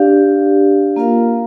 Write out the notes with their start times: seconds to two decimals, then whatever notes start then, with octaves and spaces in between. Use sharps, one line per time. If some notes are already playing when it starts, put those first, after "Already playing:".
Already playing: D4 G4 D5 F5
0.96 A#3 F4 A#4 F5